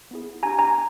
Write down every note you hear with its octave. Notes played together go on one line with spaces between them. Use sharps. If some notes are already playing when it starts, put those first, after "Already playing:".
B3 E4 G#4
D4 G4 G#5 A#5
G#5 A#5